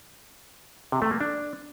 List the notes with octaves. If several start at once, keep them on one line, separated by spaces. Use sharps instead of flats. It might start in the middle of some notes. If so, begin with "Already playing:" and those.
C3
A3
A#3
D4